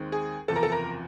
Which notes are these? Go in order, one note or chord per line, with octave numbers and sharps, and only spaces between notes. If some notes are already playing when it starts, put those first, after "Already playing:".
Already playing: D#2 D#3 G#3 C4 D#4
G#4
F#1 E2 C3 F3 A4
A#4
A4
A#4